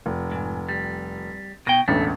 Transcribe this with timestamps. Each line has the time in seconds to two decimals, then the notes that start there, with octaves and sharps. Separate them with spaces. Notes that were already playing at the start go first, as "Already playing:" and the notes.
0.06 F1
0.32 G#2
0.69 G3
1.67 B2 G5 A#6
1.88 E1 A1 D2 A3